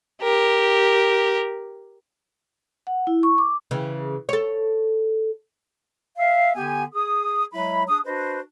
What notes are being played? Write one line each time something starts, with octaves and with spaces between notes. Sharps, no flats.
G4 A#4
F#5
E4
C#6
D6
C#3 E3
A4 C#5
E5 F5
D3 B3 G4 G#5
G#4 D#6
F#3 G#3 E4 B5
D4 G#4 D#6
D4 F#4 B4 C5 D#5